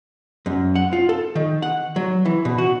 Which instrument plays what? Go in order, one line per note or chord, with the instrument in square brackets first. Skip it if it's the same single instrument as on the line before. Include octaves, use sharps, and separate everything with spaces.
[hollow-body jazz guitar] F#2
F#5
F4
A4
D#3
F#5
F#3
E3
B2
F#4